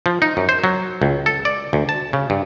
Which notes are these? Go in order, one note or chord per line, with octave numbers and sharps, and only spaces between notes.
F3
D#4
F#2
C5
F#3
C#2
A4
D5
D2
A5
C#3
G2